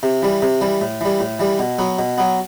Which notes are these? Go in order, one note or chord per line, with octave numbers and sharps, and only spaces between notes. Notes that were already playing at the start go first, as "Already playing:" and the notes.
C3
E3 G3
C3
E3 G3
A2
E3 G3
A2
E3 G3
B2
F#3 B3
B2
F#3 B3